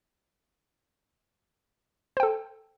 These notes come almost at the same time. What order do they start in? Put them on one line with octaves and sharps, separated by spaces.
C5 G5 A4